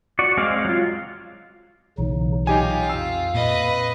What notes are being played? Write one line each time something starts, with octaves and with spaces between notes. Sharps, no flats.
F#4 D5
G#3 C4 D5 F5
F#3 F4
B1 C#3 E3 F#3 D#4
A#2 F#3 D#4 F4 G4 G#5
F2 F5 E6
A#2 B4 D#5